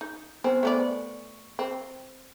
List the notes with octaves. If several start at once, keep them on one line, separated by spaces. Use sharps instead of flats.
D#4
B3 C4 C5 G#5
A3 B3 D5 C#6
C4